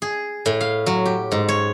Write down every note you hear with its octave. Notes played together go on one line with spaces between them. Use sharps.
G#4
A2
F5
F#3
G4
G#2
C#5